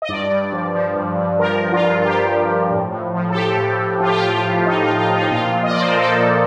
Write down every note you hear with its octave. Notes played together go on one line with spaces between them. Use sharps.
D#5
G2 D5
G2
F3
F3
G2
G2
F3 A#4
F3
F4
G2
F4
G2 G4
F3
F3
A2
A2
F3
A4
F3 G4
A2
A2
F3 F4
G4
F4
F3
G4
F4
A2
A2 D#4
F4
F3
F4
F3
D#4
A#2 F4
A#2
D#5
D5
F3 C5
A#4
F3 A4
A#2